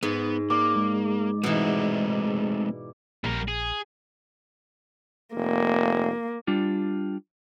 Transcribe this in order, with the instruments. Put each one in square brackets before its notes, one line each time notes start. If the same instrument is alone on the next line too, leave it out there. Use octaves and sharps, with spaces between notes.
[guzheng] G#2 [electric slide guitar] B3
[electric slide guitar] A#3 [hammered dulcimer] D5
[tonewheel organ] G#3
[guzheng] B2 E3 [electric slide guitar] A3 C4 D#4
[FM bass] A#1 [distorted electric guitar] G3 A#4
[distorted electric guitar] G#4
[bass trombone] F1 [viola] A#3
[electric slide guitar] G3 D4 F4